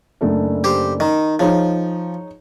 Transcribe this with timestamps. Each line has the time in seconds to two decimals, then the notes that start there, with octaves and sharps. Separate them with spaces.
0.21 F#1 A3 D4
0.64 G4 C5
1.00 D#3
1.39 F3 D#4 G#4 C#5